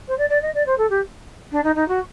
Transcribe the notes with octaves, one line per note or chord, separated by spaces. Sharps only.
C5
D5
D5
D#5
D5
C5
A4
G4
D4
D#4
D#4
F#4